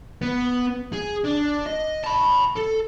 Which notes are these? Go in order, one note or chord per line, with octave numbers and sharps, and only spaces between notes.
B3
G#4
D4
D#5
A5 B5
A4